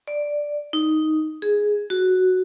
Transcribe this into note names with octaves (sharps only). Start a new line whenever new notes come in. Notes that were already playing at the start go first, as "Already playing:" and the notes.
D5
D#4
G#4
F#4